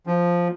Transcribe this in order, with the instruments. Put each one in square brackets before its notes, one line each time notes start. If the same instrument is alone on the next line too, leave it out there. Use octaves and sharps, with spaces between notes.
[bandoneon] F3